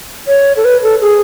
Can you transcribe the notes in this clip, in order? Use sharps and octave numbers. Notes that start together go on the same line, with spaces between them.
C#5
A4
B4
A4
G#4